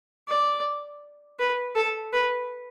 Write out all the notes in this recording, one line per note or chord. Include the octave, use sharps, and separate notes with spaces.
D5
B4
A4
B4